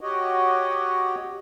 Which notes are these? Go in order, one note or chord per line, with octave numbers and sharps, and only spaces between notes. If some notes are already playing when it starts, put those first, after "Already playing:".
F#4 G4 C#5 D#5 F#5